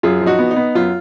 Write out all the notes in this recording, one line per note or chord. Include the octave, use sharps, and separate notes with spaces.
F#2 F4 G#4
F3
D#4 F#4
B3
D#4
B3
F#2 F4